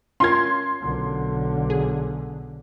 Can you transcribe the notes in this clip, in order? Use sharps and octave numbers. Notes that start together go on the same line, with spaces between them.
C#4 F4 A#4 C6 G#6
B1 D3
G#4